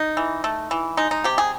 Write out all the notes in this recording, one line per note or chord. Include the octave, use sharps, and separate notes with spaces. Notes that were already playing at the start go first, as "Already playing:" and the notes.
Already playing: D#4
E3
A3
E3
G#3 D#4
D#4
C3 G4
G#4